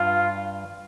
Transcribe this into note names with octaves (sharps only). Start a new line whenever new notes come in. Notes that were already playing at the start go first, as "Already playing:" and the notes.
Already playing: G2 F4